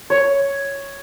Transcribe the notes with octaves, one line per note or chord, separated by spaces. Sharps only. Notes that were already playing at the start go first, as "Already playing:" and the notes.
C#5